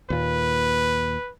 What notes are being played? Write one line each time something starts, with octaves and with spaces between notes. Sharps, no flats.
D#2 A#2 B4